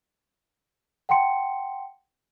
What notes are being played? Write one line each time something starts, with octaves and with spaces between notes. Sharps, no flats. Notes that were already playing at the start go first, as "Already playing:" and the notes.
F#5 G5 A5 C6 C#7